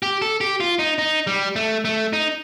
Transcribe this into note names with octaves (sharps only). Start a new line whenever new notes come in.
G4
A4
G4
F4
D#4
D#4
G3
A3
A3
D#4